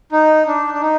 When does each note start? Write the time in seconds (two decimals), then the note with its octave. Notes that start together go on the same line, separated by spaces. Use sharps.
0.12 D#4
0.47 D4
0.74 D4
0.82 D#4